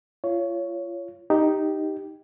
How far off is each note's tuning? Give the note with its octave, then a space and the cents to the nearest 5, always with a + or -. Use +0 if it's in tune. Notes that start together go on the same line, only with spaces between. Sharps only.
F4 -30 C#5 +10
D#4 +0 G4 +0